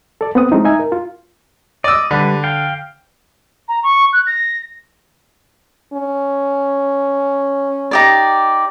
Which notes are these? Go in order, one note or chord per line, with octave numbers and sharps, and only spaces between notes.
A4 D5
B3 C4 F#5 D#6
G#3 A3 C4 C#4 D#4 E4
D#4 E5 G#5
A#4
F4
D5 D#5 E6
D3 G3 B4
F5 G5
A#5
C#6
F#6
A#6
C#4
D#4 G4 D5